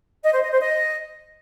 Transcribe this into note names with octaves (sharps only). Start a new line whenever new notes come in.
D#5
C5
D#5
C5
D#5